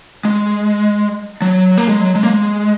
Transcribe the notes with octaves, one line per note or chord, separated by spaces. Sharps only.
G#3
F#3
A#3
G#3
F#3
G#3
A#3
G#3